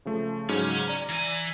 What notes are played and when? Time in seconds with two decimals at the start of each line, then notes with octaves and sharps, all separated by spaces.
0.05 C#3 F3 A3
0.49 G#2 C#3 F#3 C#4
0.88 D5 A#5
1.09 E3 G#5